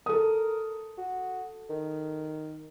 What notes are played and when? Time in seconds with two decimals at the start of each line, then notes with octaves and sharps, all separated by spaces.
0.06 A4 A#4 D#6
0.98 F#4
1.70 D#3